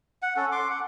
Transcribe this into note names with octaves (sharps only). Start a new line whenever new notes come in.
F#5
C#4 A4
C6 D6
F#5